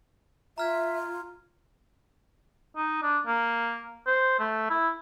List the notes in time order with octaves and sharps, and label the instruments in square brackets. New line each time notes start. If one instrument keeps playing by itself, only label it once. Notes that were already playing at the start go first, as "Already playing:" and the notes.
[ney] F4 [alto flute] E5 [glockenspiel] A#5 F6 G#6
[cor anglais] D#4
D4
A#3
C5
A3
E4